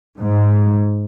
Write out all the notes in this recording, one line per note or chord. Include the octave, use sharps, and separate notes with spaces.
G#2